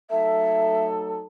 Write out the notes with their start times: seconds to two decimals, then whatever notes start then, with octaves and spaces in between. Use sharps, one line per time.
0.10 F#3 A3 D#4 A4 E5